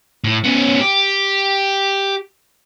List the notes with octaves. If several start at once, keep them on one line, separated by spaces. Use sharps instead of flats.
A2
B3 C#4
G4